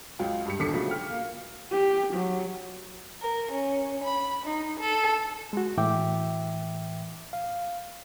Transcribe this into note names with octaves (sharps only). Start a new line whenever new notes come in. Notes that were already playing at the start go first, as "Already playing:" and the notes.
C#2 F#3 F4 G5
G2 G4 C#7
D#1 B1 D3 D6 B6 C#7
C#3 F3 F#3 A3 F#4
G5 F6
A#3
G4
F#3
A#4
C#4
B5
D#4
A4
G#3 F#4
A2 E3 E5 G5 D6
F5